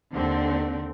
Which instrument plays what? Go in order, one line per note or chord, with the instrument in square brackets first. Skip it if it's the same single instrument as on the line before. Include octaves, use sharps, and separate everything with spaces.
[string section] D#2 D3 C4